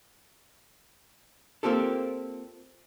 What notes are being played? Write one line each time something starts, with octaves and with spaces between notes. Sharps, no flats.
A#3 C4 F4 G4 A4